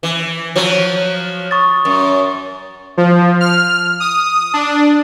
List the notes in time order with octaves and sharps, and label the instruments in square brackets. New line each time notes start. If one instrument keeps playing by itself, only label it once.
[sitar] E3
F3 F#3
[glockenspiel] C#6 D#6 A6
[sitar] F#2
[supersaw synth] F3
F6
D#6
D4